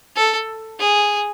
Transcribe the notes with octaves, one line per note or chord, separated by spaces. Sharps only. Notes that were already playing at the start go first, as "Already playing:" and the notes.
A4
G#4